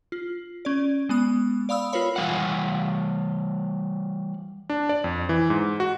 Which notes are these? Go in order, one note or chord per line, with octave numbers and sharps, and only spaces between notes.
F4
C#4 D5
G#3 B3 D#6
D5 F5 B5 D#6 E6
F4 A#4 B4 C#5 B5
E3 G3 F5 F#5
D4
D5
F2
E3
G#2
F#4